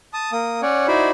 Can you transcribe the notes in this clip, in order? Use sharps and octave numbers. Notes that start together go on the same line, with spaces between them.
A5 D#6
A#3 D#6
C#4 C#5 D5 F#5
D#4 E4 F#4 C5 D5 B5